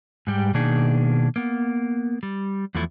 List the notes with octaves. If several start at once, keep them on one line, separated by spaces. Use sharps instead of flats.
G#2 G3 G4
B2 D#3 A#3 D4 D#4 G#4
A#3 B3
G3
E2 F3 F#3 A3 E4